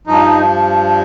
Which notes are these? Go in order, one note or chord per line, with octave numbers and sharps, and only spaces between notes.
G2 F3 D#4